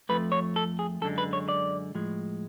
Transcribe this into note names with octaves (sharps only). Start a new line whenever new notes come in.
F2 F3 A3 B4
C#5
A4
G#4
F#2 D3 G#3 A4
B4
C#5
D5
A2 F3 G#3